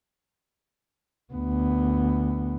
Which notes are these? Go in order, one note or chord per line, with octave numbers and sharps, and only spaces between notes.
D2 B3